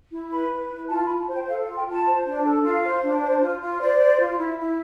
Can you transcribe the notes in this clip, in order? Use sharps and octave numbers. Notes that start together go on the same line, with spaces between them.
E4
B4 B5
B4
E4
F4 A5
B5
F4
A5
C5
G5
A4 F5
F5
F4
G5
F4 A5
C5
D4
A4
F4 F5
C5
D4
C5
F4
F4
C5 D5
C5
F4
E4
E4